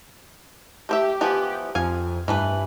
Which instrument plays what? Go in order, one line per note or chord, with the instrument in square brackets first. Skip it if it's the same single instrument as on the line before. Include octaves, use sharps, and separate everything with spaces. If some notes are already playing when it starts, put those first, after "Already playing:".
[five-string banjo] A3 C5 E5 [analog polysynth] G4
[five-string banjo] E3 F3 B3
[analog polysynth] F2 [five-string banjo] F5 G#5
[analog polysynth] G2 [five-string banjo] E3 A3 B4